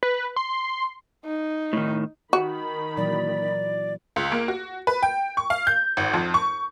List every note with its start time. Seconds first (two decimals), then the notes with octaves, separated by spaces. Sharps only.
0.03 B4
0.36 C6
1.25 D#4
1.73 A2 D#3
2.33 D#3 F#4 B5
2.97 A#2 E3 F#3 D5
4.16 C#2
4.32 A#3
4.48 F#4
4.87 B4
5.03 G5
5.37 C#6
5.50 F5
5.67 G6
5.97 G#1
6.14 F2
6.34 C#6